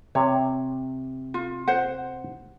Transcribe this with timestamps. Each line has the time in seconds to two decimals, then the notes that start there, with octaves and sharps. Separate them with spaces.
0.15 C3 C#5
1.34 F4
1.67 C5 F#5